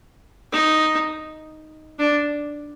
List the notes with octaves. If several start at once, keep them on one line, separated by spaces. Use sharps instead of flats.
D#4
D4